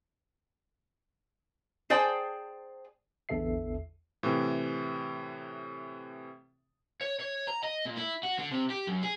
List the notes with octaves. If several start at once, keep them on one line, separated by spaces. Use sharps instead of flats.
G#4 C5 D5 G5 A5
A1 E2 D3 A4 E5 C7
A2 C3 E3
C#5
C#5
A#5
D#5
A#2
E4
F#4
D3
C3
G4
F#2
G#4